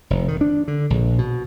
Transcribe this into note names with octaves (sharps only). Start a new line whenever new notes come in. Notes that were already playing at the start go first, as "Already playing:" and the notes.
F1
D#3
D4
D3
A#1
B2